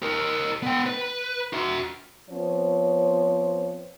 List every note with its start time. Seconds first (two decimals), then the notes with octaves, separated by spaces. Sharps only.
0.02 G4 A#4
0.63 B3 G5
0.86 B4
1.53 F#4 E5
2.30 F3 B3 C4 C#5